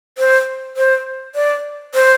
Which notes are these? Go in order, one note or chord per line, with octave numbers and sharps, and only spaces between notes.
C5
C5
D5
C5